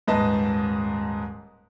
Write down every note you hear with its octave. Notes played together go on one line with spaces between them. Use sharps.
D#1 G#2 B4 D#5 A5